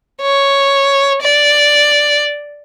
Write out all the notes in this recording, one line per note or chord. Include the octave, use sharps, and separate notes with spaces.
C#5
D5